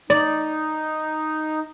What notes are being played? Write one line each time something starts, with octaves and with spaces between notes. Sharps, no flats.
D#4 D5